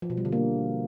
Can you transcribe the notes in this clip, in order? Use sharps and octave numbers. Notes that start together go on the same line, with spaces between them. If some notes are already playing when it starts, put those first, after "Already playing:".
F3
B2
G3
D3
A#3